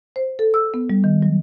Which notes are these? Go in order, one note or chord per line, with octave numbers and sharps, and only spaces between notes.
C5
A4
E6
B3
G3
D#3
F#3